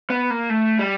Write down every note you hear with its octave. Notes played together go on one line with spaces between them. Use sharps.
B3
A#3
A3
G3